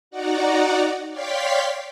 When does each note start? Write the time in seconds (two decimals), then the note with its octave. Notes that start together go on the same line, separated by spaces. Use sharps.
0.10 D#4 F#4 D5 F#5 A#5
1.10 C#5 D5 F5 G5 C6 B6